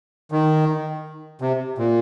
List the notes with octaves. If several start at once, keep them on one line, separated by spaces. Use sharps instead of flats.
D#3
C3
A#2